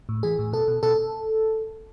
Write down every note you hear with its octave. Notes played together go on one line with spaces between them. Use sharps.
A2
E3 G#4
A2
B2 A4
B2
B2 A4